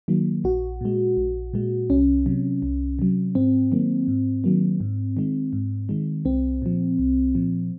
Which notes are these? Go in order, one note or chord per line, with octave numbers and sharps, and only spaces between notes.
D#3 F#3 A#3
A#1 F#4
A#2 G#3
A#1
A#2 G#3
C2 C#4
C3 F#3
C2
C3 F#3
G#2 C4
D#3 F#3 A#3
G#2
D#3 F#3 A#3
G#2
D#3 G#3
G#2
D#3 G#3
C2 C4
A#2 F3
C2
A#2 F3